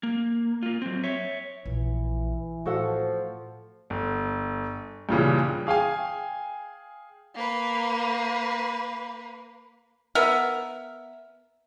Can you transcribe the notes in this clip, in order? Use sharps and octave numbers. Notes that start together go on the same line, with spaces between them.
A#3
A#3 F4
F#3 C4
C#5 E5
A#1 A#2 E3
A2 F3 F#4 A4 F#5
G1
G2 A#2 C#3 E3
G#4 F5 G5 G#5
A#3 B4
B3 A#4 E5